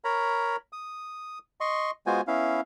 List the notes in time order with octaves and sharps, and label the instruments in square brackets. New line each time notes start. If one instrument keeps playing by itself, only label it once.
[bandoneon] A#4 C#5 A#5 B5
D#6
D#5 C6 C#6
G#3 B3 F4 F#4 C5 G#5
B3 C#4 E4 F5